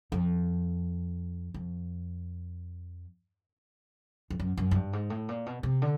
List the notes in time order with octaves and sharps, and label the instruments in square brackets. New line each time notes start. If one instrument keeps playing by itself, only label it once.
[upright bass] F2
F2
F2
F#2
F#2
G#2
G2
G#2
A2
A#2
B2
C3
D3